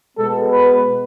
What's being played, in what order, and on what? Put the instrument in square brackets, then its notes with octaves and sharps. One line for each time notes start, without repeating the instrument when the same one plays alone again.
[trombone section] B2 G#3 B3 A4
B4